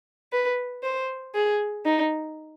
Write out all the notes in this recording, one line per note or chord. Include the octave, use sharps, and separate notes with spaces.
B4
C5
G#4
D#4